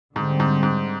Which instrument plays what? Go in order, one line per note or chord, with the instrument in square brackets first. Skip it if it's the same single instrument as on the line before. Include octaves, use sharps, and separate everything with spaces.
[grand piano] G#2 [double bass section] D3 G3 C4
[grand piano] G#2
G#2